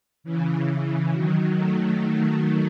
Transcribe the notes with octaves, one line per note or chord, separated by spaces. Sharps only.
C#3 E3
C#3 E3
D#3 F#3
F#3 A3